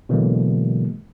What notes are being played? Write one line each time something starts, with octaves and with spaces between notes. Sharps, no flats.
B2 D3 E3 F#3 G#3 A#3